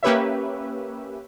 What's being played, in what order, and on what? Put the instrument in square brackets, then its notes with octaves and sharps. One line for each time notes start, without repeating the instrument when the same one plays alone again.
[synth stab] A#3 C#4 G4 B4 C#5 E5